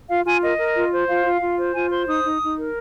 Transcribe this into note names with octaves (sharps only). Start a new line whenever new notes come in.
F4 F5
F4 G#5
A#4 D#5
A#4
F4
C5
F4 F5
F4
F4
C5
F4 G#5
C5 C6
D#4 D#6
D#4
D#4
A#4